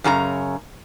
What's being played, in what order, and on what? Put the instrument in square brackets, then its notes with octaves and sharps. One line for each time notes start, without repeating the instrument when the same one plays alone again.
[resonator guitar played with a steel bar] F#2 C#3 F#4 A#5